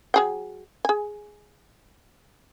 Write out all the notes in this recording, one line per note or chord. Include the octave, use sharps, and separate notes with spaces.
F#3 G#4 G5
G#4 G#5